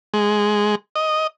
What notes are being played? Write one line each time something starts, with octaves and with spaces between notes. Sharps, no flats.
G#3
D#5